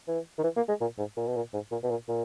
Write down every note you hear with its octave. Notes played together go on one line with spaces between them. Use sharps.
E3
D#3
E3
A#3
G#3
A#2
G#2
A#2
B2
A#2
G#2
A#2
B2
A#2
A#2